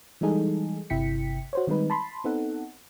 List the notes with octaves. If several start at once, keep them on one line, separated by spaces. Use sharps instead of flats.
E3 G3 G#3 D#4 G#4 A4
G1 C3 E4 G5 B6 C#7
F#4 C5 C#5
D#3 G3 G#3 C4 D#4 B4
A5 B5 C6
B3 C4 D#4 A4 F#5